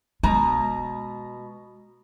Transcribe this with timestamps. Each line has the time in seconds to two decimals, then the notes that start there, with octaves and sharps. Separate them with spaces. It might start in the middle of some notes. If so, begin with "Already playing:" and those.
0.23 B2 G#3 A#5